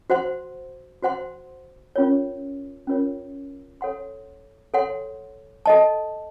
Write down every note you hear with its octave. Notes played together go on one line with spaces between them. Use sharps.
F#4 C5 F#5 C6
F#4 C5 F#5 C6
C#4 F4 A#4 C#5
C#4 F4 A#4 C#5
A4 C#5 F#5 C6
A4 C#5 F#5 C6
A4 D#5 A5